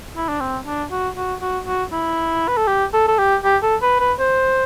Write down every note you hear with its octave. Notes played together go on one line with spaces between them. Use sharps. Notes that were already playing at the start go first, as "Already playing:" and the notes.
E4
D4
C4
D4
F#4
F#4
F#4
F#4
E4
B4
A4
G4
A4
A4
G4
G4
A4
B4
B4
C5